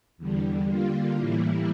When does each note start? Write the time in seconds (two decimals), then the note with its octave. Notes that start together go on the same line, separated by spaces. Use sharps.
0.18 E2 D3 G3
0.67 D3 G3 A#3 F4
1.16 A2 E3 G3 A#3 E4